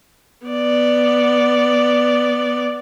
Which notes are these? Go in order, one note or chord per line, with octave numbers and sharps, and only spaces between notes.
B3 D5